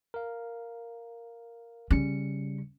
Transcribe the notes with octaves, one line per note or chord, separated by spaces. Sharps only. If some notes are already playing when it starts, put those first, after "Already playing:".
A#4 F5
C#3 G3 C#4 C#7